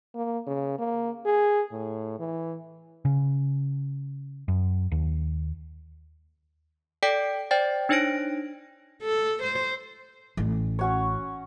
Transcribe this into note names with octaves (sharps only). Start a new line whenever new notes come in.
A#3
C#3
A#3
G#4
A2
E3
C#3
F#2
D#2
A4 D5 G5 B6 D7
C5 D5 G5 A6
D4 D#4 C5 C#5 A#6 D7
A4
C5
A1
C#4 F#4 C#5